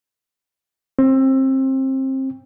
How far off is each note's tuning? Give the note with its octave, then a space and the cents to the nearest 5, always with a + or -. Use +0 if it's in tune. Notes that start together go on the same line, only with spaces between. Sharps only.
C4 +25